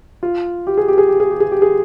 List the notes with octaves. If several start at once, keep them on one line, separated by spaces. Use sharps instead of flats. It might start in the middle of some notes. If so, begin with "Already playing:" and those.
F4
G4
G#4
G4
G#4
G4
G#4
G4
G#4
G4
G#4